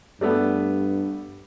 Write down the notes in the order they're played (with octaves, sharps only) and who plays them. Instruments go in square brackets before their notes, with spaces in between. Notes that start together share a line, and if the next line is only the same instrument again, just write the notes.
[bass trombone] G2 [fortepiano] G3 A3 B3